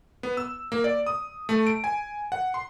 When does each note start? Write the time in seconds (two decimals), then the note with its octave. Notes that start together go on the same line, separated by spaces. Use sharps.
0.23 B3
0.37 E6
0.72 A#3
0.84 D5
1.07 D#6
1.49 A3
1.67 D7
1.84 G#5
2.32 F#5
2.54 C6